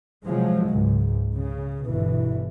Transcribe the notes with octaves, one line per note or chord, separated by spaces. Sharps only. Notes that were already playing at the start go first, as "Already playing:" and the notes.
C3 F3 F#3 G#3
C#2 G#2
C#3
G1 B2 E3